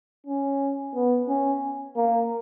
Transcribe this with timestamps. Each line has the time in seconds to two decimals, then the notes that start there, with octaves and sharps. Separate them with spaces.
0.27 C#4
0.95 B3
1.28 C#4
1.96 A#3